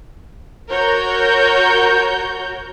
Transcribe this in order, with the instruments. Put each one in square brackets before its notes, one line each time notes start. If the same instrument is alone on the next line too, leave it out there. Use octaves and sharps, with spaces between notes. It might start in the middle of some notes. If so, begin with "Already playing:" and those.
[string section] F#4 A#4 C#5 A#5 G6